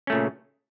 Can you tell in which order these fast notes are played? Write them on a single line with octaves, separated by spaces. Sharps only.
C#4 A3 A#2 C#3